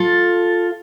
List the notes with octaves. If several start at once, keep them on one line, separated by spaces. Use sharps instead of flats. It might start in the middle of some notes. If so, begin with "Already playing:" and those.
Already playing: F4 A4